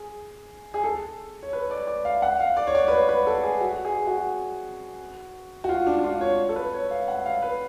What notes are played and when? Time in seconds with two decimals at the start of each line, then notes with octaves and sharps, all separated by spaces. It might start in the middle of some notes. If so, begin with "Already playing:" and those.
Already playing: G#4
0.74 G#4
0.84 A4
1.43 C#5
1.53 B4
1.71 D5
1.87 D5
2.05 F5
2.22 F#5
2.39 F5
2.57 D5
2.67 C#5
2.75 D5
2.88 B4
2.92 C#5
3.09 B4
3.27 A4
3.43 G#4
3.61 F#4
3.85 G#4
4.07 F#4
5.64 F#4
5.69 F4
5.87 D4
5.99 D4
6.04 F4
6.21 C#5
6.49 A4
6.56 B4
6.74 C#5
6.91 F5
7.08 F#5
7.26 F5
7.42 B4